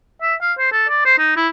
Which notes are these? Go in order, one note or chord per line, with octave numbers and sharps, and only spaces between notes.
E5
F5
C5
A4
D5
C5
D#4
E4